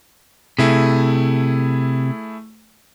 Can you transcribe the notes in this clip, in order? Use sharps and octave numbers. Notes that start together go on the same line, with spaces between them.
C3 A3 E4 G#4